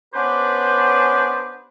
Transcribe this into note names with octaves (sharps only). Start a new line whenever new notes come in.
B3 C#4 D4 G4 B4 C5